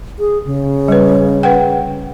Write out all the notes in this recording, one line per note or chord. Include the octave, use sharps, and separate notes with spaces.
G#4
C#3
G3 B4
B4 F#5 G5